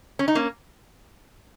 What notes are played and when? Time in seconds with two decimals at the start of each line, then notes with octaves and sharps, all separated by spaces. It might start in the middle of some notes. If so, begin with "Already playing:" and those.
0.19 C#4
0.28 D#4
0.35 A#3 C#4